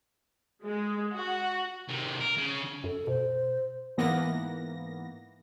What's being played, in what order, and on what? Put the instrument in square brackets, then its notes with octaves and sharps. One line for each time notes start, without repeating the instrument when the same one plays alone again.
[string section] G#3
F#4
[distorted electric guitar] C3 D#3
A#4
C#3
[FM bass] F#2 [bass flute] A4
[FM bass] B2 [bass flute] C5
[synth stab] G#2 E3 A#3 B3 A#6